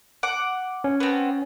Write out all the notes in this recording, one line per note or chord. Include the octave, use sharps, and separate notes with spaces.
F#5 D6
C#4
B3 C4